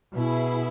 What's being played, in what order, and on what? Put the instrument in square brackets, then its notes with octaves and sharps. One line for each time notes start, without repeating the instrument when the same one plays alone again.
[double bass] B2 [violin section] B3 E4 G#4